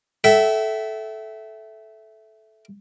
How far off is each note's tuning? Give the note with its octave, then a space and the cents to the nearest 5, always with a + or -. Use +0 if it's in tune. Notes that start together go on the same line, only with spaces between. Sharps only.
A4 -15 E5 +0 G5 -45